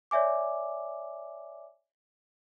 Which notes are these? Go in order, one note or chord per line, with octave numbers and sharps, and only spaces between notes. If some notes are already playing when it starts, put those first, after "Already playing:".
C#5 D5 E5 G#5 D6